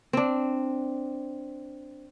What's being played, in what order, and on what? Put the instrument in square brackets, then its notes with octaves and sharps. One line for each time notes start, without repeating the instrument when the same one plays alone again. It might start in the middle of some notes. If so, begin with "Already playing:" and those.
[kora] C4 D4